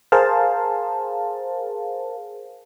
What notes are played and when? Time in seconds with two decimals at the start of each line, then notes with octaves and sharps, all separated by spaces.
0.12 G#4 A#4 C5 F5 A5